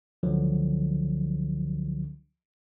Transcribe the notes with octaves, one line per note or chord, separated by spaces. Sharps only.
C#2 D3 F3 F#3